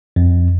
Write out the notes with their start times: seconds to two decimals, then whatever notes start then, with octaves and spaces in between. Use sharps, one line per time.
0.16 F2